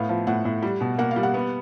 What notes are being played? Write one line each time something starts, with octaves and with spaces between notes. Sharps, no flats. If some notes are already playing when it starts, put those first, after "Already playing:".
Already playing: A2 B3 F5
F3
A2 F#5
A2
G3
B2
A#3 F#5
F5
G3
F#5
B3